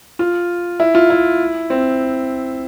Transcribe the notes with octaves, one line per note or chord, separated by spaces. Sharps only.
F4
E4
F4
E4
C4